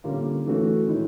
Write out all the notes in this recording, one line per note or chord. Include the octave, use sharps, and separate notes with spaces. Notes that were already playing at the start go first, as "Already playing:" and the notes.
D3 G3 A#3 C#4 F4
E3 A3 C#4 F#4
D#3 G#3 C#4 E4